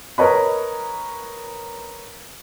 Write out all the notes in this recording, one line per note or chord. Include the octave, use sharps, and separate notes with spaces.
A#4 B4 C#5 D#5 B5